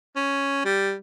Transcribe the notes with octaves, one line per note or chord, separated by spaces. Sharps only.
C#4
G3